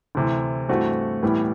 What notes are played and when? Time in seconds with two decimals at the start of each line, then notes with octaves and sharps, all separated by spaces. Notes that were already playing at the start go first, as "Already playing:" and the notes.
0.15 D2 C3 E3
0.69 G2 E3 A3 C4 F#4
1.23 A2 E3 G3 B3